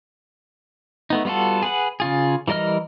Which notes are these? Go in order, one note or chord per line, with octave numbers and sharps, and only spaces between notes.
A3 B3 D#4
G3 B3 F4 F#4 A4
G#4 B4 F#5
C#3 F4 G#4
E3 G3 A#4 D#5 F6